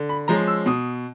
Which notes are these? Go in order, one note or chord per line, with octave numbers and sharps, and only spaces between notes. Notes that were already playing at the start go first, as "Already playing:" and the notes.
Already playing: D3
B5
F3 G#3 C#4 A#5
E6
B2 D#6